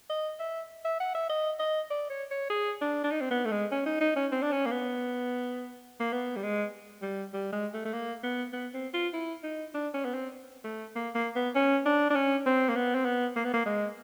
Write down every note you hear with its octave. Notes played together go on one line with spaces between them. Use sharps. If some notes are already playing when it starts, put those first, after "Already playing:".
D#5
E5
E5
F#5
E5
D#5
D#5
D5
C#5
C#5
G#4
D4
D4
D#4
C4
B3
A3
G#3
C#4
D#4
D#4
C#4
C4
D4
C#4
A#3
B3
A#3
B3
G3
G#3
G3
G3
G#3
A3
A3
A#3
B3
B3
C4
F4
E4
D#4
D4
C#4
B3
C4
A3
A#3
A#3
B3
C#4
D4
D4
C#4
C4
A#3
B3
C4
B3
A#3
B3
A#3
G#3